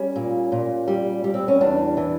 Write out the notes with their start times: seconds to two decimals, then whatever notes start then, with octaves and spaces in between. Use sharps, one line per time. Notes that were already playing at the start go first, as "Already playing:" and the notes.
Already playing: G3 C#4
0.16 A#2
0.52 A#2
0.88 G3
1.24 G3
1.34 C4
1.48 C#4
1.60 E2 D4
1.97 E3